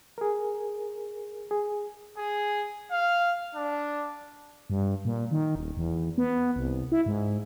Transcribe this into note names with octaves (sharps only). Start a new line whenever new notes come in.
G#4 A#4
G#4
G#4
F5
D4
G2
A#2
D#3
D#1
E2
B3
C2
E4
G#2